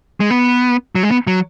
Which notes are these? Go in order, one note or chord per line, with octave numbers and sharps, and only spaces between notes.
G#3
B3
F#3
G#3
B3
F#3